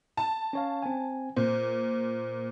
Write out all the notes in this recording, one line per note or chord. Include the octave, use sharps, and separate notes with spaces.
A5
C#4 C#5 F5
C4 G#5
A#2 C5